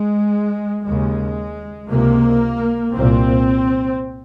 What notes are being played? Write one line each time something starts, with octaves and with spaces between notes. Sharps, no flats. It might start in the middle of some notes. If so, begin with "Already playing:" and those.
Already playing: G#3
D#2 C#3 G#3
C#2 C3 A#3
C2 A#2 C4